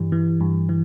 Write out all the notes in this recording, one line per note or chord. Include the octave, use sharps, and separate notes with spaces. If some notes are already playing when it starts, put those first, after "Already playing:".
Already playing: G2 E3 G3
E3
G2
E3